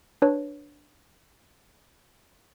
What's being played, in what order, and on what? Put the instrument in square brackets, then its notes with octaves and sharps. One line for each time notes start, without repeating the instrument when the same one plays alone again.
[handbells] D4 B4 C#5